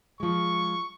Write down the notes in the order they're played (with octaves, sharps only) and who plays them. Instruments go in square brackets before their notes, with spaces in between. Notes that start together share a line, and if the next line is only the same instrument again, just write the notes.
[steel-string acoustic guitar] F3 G#3 [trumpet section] C#6